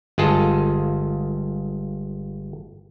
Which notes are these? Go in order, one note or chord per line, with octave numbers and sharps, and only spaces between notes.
G1 G#3 F4 G#4 A4